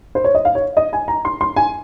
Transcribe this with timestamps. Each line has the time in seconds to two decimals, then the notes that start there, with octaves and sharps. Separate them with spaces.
0.15 C5
0.24 C#5
0.35 D#5
0.45 F5
0.55 C#5
0.77 D#5
0.93 G#5
1.08 A#5
1.25 C6
1.41 C6
1.56 G#5